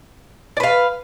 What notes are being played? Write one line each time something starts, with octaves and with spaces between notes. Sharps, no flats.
B4 D5 F5